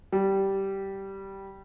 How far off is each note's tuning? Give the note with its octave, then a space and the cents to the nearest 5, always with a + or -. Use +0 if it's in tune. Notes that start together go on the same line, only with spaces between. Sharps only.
G3 -10